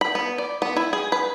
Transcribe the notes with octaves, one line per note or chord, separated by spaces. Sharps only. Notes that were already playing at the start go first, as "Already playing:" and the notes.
B5
B3
D5
B3
E4
G#4
B4